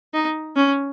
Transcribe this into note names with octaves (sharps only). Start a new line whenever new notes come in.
D#4
C#4